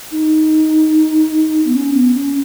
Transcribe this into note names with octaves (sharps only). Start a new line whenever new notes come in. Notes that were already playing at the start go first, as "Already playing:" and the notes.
D#4
B3
C#4
B3
C#4